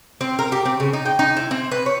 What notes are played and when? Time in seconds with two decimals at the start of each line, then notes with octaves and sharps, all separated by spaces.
0.21 C4
0.39 A#4
0.52 G4
0.65 C4
0.80 C#3
0.93 D#4
1.05 G5
1.19 D#4
1.37 E4
1.51 C4
1.71 B4
1.86 C#5